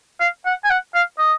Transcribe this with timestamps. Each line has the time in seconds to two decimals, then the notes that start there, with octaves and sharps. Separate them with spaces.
0.20 F5
0.46 F#5
0.64 G#5
0.70 F#5
0.94 F5
1.18 D#5